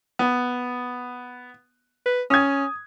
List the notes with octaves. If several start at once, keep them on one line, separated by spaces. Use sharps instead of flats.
B3
B4
C#4 D#6 G#6